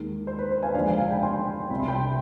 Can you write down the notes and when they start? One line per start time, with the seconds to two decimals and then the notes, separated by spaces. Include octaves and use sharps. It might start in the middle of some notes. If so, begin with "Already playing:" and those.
Already playing: D#2 D#3 G#3
0.27 C5
0.38 B4
0.51 C5
0.63 F5 G#5
0.75 D#2 D3 F3 G#3 D5 F5
0.87 F5 G#5
0.98 F5 G#5
1.10 G5 B5
1.23 G#5 C6
1.70 C2 C3 G3 B5
1.80 C6
1.88 G5 B5